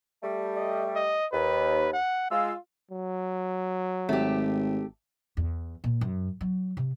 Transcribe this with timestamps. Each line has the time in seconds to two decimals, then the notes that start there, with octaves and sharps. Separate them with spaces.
0.23 G3 A3
0.56 D#5
0.96 D#5
1.33 D#2 B4
1.93 F#5
2.31 G#3 F4 E6
2.91 F#3
4.09 G#1 A3 G4
5.37 E2
5.84 A#2
6.01 F#2
6.41 F#3
6.77 C3